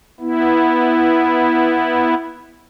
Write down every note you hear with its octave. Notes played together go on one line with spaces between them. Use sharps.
B3 E4